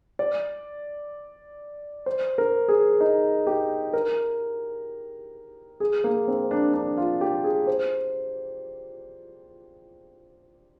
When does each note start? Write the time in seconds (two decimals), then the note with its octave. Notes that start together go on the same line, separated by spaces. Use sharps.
0.19 D5
2.06 C5
2.38 A#4
2.68 G#4
3.00 D#4
3.47 G4
3.93 A#4
5.80 G#4
6.04 A#3
6.28 C4
6.51 D4
6.74 D4
6.97 F4
7.21 G4
7.44 G#4
7.67 C5